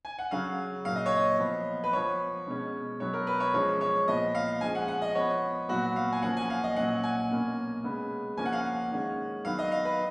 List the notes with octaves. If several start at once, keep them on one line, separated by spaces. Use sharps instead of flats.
G#5
F#5
C#3 F#3 C#4 F5
A#2 F#3 A#3 F5
D#5
C#5
D#5
F3 B3
B4
F3 B3 C#5
B2 G#3 C#4
B2 F#3 B3 C#5
A#4
B4
C#5
F3 G#3 C#4 C#5
C#5
A#2 F3 B3 D#5
F5
F3 G#3 C#4 G#5
F#5
F#5
D#5
F3 B3 C#5
A#2 F#3 B3 F#4
F5
G#5
F3 A#3 C#4 F#5
G#5
F5
D#5
A#2 F#3 C#4 F#5
G#5
B2 A#3 C#4
C#3 G#3 B3
F3 A#3 C#4 G#5
F#5
F5
F#5
D#3 G#3 C#4
D#3 F#3 B3 F5
D#5
F5
B4